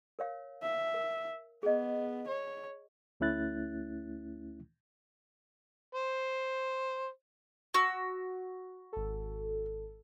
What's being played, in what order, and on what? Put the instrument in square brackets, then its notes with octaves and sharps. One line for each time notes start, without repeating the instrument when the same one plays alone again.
[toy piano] A#4 C#5 F5
[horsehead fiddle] E5
[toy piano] A#4
[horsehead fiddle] B3 [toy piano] G#4 D#5
[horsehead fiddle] C#5
[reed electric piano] D2 A3 C#4 E4 F#6 A6
[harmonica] C5
[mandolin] F#4 E6
[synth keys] G#1 A4